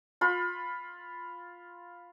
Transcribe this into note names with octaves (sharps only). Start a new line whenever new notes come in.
F4 B5